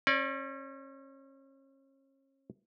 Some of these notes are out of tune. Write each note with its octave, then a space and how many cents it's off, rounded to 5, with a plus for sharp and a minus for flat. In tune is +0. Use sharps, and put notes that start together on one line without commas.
C#4 -35 D5 +0